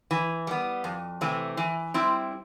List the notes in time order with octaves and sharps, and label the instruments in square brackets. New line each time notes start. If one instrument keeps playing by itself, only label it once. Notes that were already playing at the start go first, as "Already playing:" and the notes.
[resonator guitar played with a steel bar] E3
G3 B3
F2
C3 E3 A3 C4
E3
G3 C4 E4